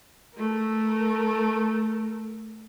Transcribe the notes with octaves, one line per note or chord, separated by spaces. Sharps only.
A3 A#4